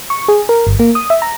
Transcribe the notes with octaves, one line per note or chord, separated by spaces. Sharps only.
C#6
G#4
A#4
G1
A#3
D#6
E5
A#5